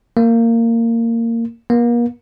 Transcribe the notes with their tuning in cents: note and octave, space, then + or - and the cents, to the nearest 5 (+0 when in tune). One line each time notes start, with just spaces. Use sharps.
A#3 -20
A#3 +35